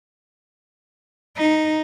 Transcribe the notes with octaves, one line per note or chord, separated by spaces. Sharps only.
D#4